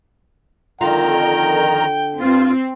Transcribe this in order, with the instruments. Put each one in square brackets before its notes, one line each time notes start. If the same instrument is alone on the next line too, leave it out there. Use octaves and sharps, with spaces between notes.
[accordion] F2 D#3 A#5 [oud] D3 F4 [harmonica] G5
[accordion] G2 F4 [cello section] C4